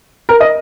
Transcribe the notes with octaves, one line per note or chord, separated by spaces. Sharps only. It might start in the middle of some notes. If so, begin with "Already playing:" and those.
A#4
D#5